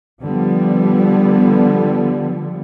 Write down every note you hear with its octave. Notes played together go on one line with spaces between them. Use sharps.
D3 F3 G3 B3